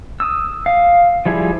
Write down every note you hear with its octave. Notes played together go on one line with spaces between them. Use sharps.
D#6 E6
F5
F3 G3 E4 G#4